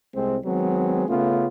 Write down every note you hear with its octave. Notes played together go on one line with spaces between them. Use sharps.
C2 G#3 C4
D#3 F#3 G#3 B3 C4
C#3 A3 B3 C#4 F4